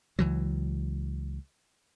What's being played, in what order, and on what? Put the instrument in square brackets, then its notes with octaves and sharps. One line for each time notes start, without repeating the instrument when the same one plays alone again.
[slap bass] C#2 E3 F#3